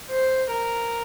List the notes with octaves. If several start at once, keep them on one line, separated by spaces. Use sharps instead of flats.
C5
A#4